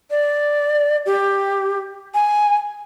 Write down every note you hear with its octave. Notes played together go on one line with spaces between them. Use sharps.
D5
G4
G#5